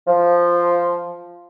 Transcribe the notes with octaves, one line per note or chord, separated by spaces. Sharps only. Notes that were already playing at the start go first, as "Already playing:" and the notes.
F3